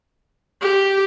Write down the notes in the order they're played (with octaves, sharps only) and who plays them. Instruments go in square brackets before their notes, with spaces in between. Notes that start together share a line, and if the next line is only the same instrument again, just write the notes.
[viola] G4